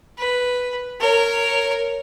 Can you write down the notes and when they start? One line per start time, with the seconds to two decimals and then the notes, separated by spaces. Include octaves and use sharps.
0.18 B4
1.00 A#4 C#5